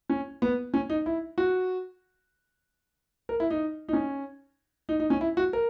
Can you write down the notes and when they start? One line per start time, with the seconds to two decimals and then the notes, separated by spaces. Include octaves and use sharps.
0.10 C#4
0.42 B3
0.74 C#4
0.90 D#4
1.06 E4
1.38 F#4
3.29 A#4
3.40 E4
3.50 D#4
3.89 D#4
3.93 C#4
4.89 D#4
5.00 D#4
5.10 C#4
5.21 E4
5.37 F#4
5.53 A#4